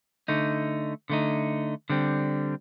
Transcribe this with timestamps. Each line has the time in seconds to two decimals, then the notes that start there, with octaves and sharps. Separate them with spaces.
0.28 D3 A3 D#4
1.10 D3 A3 D#4
1.90 D3 G3 C4